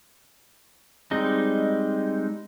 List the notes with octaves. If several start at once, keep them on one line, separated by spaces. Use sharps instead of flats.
G3 G#3 C4 D#4